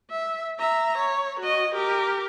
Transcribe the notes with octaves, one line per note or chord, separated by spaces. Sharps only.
E5
E5 A#5
C#5
F#4 D#5
G4 A#4